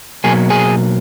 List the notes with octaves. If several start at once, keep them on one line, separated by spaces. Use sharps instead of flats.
B2 F#3 A#3 G#4 G#5
G#4 G#5